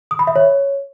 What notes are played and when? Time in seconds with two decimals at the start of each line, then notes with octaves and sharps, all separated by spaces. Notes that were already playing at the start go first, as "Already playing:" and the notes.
0.11 D#6
0.19 B5
0.27 E5
0.36 C#5